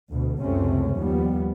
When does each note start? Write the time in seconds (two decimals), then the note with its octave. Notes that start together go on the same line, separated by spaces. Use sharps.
0.11 D2 B2
0.40 C#2 F#2 C3 A3 C4 C#4
0.95 D#2 F3 G3 B3